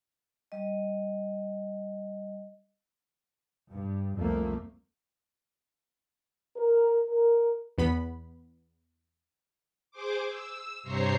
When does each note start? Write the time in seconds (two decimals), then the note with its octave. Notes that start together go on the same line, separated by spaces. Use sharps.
0.52 G3 D#5
3.70 G2
4.15 C2 F2 F3 A3 A#3
6.56 A#4
7.08 A#4
7.78 E2 B3 B5
9.91 G#4 C5 D6
10.27 E6
10.83 G2 C3 C5 C#5 A#5 C7